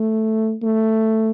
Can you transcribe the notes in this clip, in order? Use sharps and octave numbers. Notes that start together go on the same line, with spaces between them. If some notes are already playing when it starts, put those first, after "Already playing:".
Already playing: A3
A3